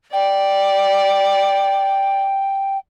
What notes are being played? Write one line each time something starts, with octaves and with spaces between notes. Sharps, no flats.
D5 G5